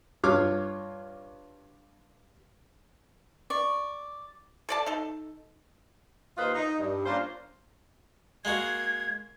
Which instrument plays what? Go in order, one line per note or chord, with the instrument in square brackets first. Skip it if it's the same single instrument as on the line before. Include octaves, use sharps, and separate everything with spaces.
[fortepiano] G2 F4 C#5 D6 F6
[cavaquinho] D5 C#6
[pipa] A4 D5 A5
D#4 A4
[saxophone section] D#2 A#3 F4 B4 C5 D#5
D#4
G2
A#3 C#4 D4 F4 C5
[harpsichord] G#3 A#3 F#4 [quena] G#6